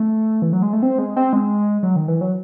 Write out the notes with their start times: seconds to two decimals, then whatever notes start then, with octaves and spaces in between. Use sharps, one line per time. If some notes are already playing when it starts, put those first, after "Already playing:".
Already playing: A3
0.42 E3
0.53 F#3
0.62 G#3
0.73 A3
0.83 C4
0.99 G#3
1.16 C4
1.33 G#3
1.83 F#3
1.96 D#3
2.08 E3
2.21 F#3